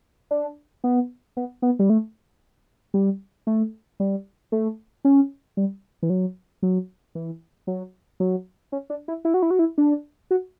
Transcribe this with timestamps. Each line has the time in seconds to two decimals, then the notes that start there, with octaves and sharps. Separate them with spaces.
0.31 D4
0.84 B3
1.37 B3
1.62 B3
1.79 G3
1.90 A3
2.94 G3
3.47 A3
4.00 G3
4.52 A3
5.05 C#4
5.57 G3
6.03 E3
6.10 F#3
6.62 F#3
7.15 E3
7.67 F#3
8.20 F#3
8.72 C#4
8.90 D4
9.08 E4
9.25 E4
9.34 F#4
9.42 E4
9.51 F#4
9.59 E4
9.78 D4
10.31 F#4